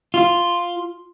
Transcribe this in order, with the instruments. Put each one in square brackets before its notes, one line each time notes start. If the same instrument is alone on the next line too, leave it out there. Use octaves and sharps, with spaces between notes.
[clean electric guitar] F4